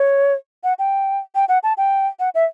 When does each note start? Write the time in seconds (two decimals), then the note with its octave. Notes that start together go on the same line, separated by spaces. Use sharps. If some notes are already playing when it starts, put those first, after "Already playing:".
Already playing: C#5
0.64 F#5
0.79 G5
1.35 G5
1.49 F#5
1.63 A5
1.77 G5
2.20 F#5
2.35 E5